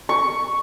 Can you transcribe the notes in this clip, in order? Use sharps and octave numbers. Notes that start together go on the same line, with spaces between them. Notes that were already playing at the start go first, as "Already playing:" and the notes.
C#6